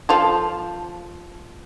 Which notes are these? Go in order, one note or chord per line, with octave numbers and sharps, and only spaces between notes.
F3 F4 A4